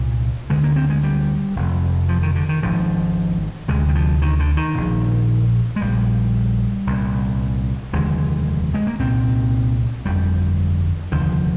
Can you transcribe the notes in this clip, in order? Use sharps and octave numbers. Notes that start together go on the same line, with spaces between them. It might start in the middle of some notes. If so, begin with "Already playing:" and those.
Already playing: C2 A#2
D2 D3 G#3
A#3
C4
G#3
G3
F1 F2 C3
F3
D#3
D3
D#3
G#1 G#2 F3
D2 C3 G#3
G3
F3
D#3
D3
D#3
A#1 A#2
G#3
A#1 A#2 G3
C2 A#2
F1 D#2 D3 G#3
G#3
A#3
C2 A#2 C4
G1 F2 D3 G3
F1 D#2 D3 F3